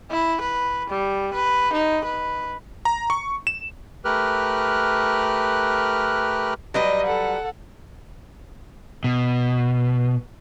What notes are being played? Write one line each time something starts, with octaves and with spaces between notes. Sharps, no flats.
E4
B4
G3
B4
D#4
B4
A#5
C#6
E7
A3 G4 A#4 B4 F6 F#6
F#3 G3 B4 D#5
A4 F#5
B2